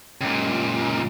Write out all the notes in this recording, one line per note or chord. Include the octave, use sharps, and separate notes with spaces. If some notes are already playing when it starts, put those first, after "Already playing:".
C#2 A#2